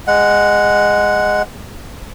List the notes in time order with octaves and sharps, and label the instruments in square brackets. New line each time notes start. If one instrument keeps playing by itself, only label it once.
[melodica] G#3 F#5